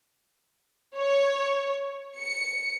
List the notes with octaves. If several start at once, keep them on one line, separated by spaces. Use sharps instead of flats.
C#5
C#7